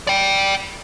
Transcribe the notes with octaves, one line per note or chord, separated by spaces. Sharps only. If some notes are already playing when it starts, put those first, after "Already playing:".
D5 G5